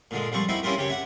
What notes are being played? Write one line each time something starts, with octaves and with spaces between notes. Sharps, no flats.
A#2 D3 G#3
F3 G3 C4 C#6
C4 D#4 E4 F#4
A#3 C#4 E4 F4 G4 A#4
C#3 G4 C#5
E5 F#5